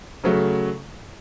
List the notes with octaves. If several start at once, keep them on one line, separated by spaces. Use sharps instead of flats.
C#3 F#3 A3